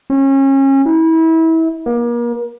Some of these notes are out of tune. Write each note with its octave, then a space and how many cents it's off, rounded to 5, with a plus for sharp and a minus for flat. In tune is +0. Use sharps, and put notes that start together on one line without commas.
C#4 -30
E4 -30
A#3 +35